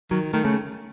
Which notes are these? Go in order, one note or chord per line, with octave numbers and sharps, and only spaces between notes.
D#3 F#3
D#3 A3
C#3 A3